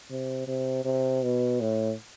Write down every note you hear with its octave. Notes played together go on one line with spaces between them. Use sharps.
C3
C3
C3
B2
A2